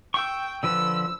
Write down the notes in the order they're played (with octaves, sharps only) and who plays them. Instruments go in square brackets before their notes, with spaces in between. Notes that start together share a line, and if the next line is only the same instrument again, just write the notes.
[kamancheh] G5 [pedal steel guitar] C#6 E6
[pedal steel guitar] D3 F3 B4 [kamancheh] E6